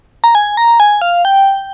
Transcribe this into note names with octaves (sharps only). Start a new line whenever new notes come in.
A#5
G#5
A#5
G#5
F5
G5